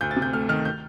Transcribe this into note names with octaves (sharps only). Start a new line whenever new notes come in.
D2 G6
A6
C3
G6
A3 F6
D#3 F6
G6